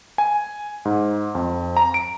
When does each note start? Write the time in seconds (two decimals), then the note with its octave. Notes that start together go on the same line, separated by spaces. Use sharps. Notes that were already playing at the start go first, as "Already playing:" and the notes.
0.18 G#5
0.85 G#2
1.35 F2
1.77 A#5
1.94 D7